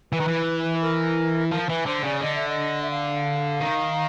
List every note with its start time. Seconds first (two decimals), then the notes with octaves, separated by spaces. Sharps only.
0.12 E3 B4
0.20 D#3
0.28 E3
0.82 A#4
1.52 F3 A#4
1.69 E3 B4
1.86 D3 C5
2.04 C#3 D5
2.21 D3 D#5
2.35 E5
2.49 D#5
2.82 E5
2.91 F5
3.61 D#3